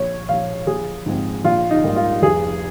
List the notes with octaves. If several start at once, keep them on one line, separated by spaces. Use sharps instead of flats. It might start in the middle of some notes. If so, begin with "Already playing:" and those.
Already playing: A#1 C#5
A#2 F3 F5
A#1 G#4
G#2 F3 C4
A#1 F4
D#4
G#2 G3 A#3
F4
F1 G#4